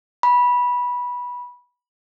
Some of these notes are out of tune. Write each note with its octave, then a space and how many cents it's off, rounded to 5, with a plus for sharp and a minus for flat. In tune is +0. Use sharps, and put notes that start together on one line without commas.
B5 -15